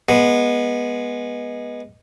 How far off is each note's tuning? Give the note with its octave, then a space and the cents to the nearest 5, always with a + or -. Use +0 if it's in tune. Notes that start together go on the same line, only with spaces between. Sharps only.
G#3 +0 B3 -20